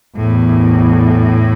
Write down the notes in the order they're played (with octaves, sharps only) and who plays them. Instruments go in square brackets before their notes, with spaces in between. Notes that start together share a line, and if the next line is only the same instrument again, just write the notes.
[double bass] E2 [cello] A2